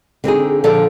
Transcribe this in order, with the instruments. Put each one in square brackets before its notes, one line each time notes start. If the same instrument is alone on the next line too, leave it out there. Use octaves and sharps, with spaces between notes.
[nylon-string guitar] D3 C4 D#4 G#4
A#2 D3 F3 A4 D5